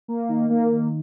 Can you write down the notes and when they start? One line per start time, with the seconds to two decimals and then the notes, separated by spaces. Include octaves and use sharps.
0.08 A#3
0.29 D#3
0.50 A#3
0.72 D#3